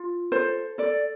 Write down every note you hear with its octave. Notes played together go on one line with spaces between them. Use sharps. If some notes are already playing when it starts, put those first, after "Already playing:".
Already playing: F4
A4 C5
A4 D5